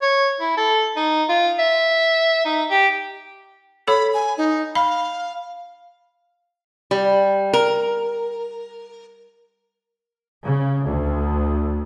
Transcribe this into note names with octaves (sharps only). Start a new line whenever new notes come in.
C#5
E4
A4
D#4
F4
E5
D#4
G4
A4 C#5 B5
G#5
D#4
F5 B5
G3
A#4
C#3
D2